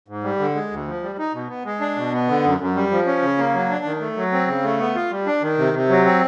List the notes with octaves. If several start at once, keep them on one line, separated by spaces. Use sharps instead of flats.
G#2
G3
D3
G#3
D2
F3
G3
D#4
B2
B3
G#3
D4
B2
B3
D3
F#2
F#2
G3
F3
C#4
C#3
A#3
F#3
D4
D#3
A3
F#3
C4
C#3
A3
B3
F4
G3
D4
D#3
C3
C3
F#3
C4